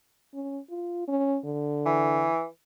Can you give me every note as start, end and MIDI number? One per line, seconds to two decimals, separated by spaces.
0.34 0.59 61
0.70 1.07 65
1.08 1.38 61
1.45 2.30 50
1.86 2.44 52